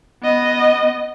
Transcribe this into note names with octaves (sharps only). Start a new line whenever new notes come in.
B3 D#5